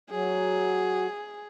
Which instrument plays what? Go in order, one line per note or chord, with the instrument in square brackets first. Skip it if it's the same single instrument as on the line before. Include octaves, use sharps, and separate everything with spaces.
[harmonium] F#3 [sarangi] G#4